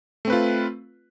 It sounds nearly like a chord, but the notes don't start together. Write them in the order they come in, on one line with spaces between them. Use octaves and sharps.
A3 C4 B4 F4